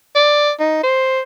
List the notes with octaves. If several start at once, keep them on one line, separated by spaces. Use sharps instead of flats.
D5
D#4
C5